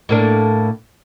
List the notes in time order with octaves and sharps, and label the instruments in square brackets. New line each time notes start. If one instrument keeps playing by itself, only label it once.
[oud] A2 A#3 D4